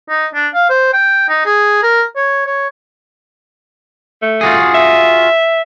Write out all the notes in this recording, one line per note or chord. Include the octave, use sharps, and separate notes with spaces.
D#4
D4
F5
C5
G5
D#4
G#4
A#4
C#5
C#5
A3
F4 F#4 G#4
E5